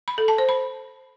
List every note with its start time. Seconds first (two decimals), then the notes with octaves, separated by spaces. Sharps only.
0.08 B5
0.18 A4
0.28 A5
0.38 C5
0.49 B5